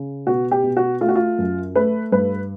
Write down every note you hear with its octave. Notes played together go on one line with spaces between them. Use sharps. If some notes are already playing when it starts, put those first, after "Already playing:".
Already playing: C#3
B2 F#4
G4
B2
F#4
A3 F4
F#4
F4
F#2
A3 B4
G2 B4